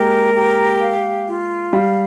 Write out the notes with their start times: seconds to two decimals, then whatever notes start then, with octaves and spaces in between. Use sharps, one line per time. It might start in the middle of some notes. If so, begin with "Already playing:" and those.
Already playing: G#3 A#3 G4 A#4
0.34 G4
0.80 F5
1.27 F4
1.73 G3 F5